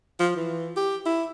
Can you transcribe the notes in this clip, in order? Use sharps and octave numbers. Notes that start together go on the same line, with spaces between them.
F3
E3
G4
E4